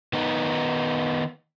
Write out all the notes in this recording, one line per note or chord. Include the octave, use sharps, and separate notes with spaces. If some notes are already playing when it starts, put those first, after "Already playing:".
D#3 B3 D#4